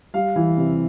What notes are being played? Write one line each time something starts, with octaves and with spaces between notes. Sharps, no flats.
G3 F5
E3
C3